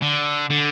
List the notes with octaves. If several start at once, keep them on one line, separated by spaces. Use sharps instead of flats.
D3
D3